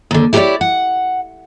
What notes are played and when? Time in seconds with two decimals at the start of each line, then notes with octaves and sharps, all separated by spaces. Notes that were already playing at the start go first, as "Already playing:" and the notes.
0.11 D#2 D3
0.33 E4 G4 A#4 B4 C#5 D5
0.61 F#5